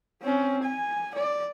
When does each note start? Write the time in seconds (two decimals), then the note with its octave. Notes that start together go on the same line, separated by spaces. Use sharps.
0.22 C4 C#4
0.63 G#5
1.15 D5